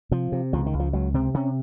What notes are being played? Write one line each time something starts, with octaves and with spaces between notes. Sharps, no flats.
C3 F3
C3
C#2 F3
D#3
C#2
F3
C#2 F#3
C3 C4
C3 C#4